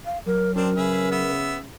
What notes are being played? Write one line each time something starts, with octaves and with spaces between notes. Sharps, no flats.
F5
F#3 A#4
F#2 C4 D4 A#4
C#3 G#4 B4 E5
B3 E5